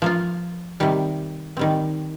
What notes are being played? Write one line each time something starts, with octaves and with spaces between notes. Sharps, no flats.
F3 A#3 F4
C3 D#3 G3
D#3 G3 C4